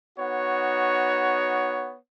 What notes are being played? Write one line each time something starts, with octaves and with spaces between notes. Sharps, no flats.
B3 D#4 F#4 C#5